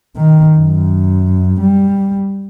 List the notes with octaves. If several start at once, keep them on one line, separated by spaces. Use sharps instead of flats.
D#3
F#2
G3